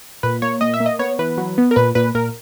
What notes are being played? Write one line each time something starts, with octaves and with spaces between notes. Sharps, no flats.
A#2 B4
A#3 C#5
A#2 D#5
E5
A#3
D#5
B3 C#5
E3 B4
F#3
B3
A#4
A#2 B4
A#2 B4
A#2 A#4